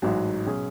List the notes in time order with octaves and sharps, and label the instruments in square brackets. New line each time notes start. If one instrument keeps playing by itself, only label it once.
[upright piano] A1 G#2 F#3
B2 F#3 C#4 G#4